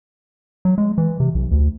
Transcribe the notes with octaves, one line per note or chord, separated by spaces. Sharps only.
F#3
G#3
E3
C3
B1
D2